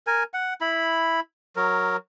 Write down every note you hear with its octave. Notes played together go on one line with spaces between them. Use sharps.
A#4 G#5
F#5
E4 B5
F#3 A#4